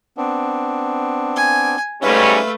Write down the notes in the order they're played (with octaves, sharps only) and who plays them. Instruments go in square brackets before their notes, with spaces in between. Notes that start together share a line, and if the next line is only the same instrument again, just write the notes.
[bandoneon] B3 C4 D4
[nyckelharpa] G#5
[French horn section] G#2 G3 C#4 [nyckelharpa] A3 B4 [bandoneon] E5 F5